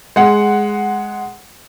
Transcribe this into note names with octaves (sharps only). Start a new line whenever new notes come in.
G#3 F#5